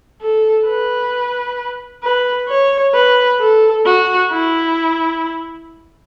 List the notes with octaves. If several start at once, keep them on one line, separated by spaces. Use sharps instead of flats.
A4
B4
B4
C#5
B4
A4
F#4
E4